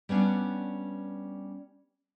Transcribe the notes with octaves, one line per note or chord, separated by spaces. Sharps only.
G3 B3 C#4 D4